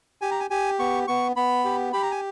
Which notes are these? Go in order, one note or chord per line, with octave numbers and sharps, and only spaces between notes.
G4 G#5
A#5
G#5
G4 G#5
B3 C#6
B3 C#6
B3 B5
G4
G4 B5
A#5
G#5